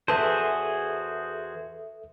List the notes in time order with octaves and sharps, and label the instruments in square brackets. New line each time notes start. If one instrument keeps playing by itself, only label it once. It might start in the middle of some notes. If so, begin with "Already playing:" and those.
[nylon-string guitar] E2 B4 A5 [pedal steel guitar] F#4 G#4 C5 [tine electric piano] A4 E5